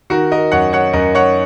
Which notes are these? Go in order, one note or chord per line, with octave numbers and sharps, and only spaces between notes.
D#3 F#4 A#4
A#4 D#5
F#2 C#5 F#5
C#5 F#5
F#2 A#4 D#5
C#5 F#5